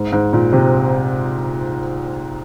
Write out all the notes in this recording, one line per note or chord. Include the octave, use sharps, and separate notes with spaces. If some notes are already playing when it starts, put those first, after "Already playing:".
Already playing: G#2
G#2
A#2
C3